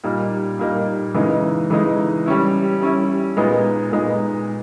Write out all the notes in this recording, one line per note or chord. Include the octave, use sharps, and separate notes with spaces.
A#2 G3 A#3 D#4
A#2 G3 A#3 D#4
C#3 E3 G#3 D#4
C#3 E3 G#3 D#4
G3 C#4 E4
G3 C#4 E4
A#2 G#3 B3 D#4
A#2 G#3 B3 D#4